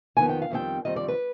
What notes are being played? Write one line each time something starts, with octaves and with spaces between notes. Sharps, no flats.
F2 D#3 B3 G#5
G5
F5
F2 D#3 G3 C4 G5
F2 D#3 G3 C4 D#5
D5
B4